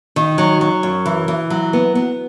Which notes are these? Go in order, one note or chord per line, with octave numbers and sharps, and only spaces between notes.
D#3
F#3
F#3
F#2
E3
E3
F#3
B3
B3